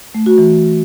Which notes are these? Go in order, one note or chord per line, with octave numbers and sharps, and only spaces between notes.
A3
F#4
E3